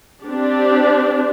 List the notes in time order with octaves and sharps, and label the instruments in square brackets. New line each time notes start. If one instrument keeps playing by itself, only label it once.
[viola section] C4 D4 G4 D5